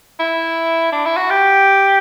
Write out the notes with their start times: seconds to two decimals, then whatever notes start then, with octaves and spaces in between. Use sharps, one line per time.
0.19 E4
0.92 D4
1.05 E4
1.17 F#4
1.30 G4